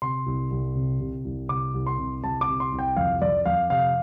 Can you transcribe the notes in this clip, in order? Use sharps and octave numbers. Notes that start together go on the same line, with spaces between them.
C3 C6
C2
C2
C3
C3
C2
C3 D6
C2
C6
C3
C2 A5
D6
C3
C6
C2
G5
F2 F5
F2 D5
F2 F5
C3 F5